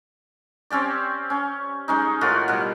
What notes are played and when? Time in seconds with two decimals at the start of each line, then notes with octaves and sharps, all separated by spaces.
0.70 C4 C#4 G4 D5
1.30 C#4
1.88 G#3 C#4 D#4
2.21 A2 D#3 F4 F#4
2.48 B2 G3